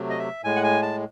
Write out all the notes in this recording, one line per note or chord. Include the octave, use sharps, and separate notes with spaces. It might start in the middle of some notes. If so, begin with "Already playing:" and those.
Already playing: C3 F#3 A3
D#5
E5
A2 G#3 G#5
F#5
G#5
A5